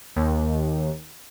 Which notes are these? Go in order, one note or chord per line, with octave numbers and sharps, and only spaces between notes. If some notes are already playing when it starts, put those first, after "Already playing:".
D#2